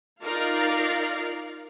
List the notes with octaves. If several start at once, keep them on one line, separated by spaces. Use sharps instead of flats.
D#4 F4 A#4 D5 F5